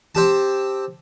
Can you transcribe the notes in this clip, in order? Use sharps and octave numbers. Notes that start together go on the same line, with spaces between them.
C4 G4 A5